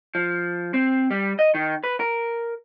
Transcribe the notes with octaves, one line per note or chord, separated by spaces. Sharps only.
F3
C4
G3
D#5
D#3
B4
A#4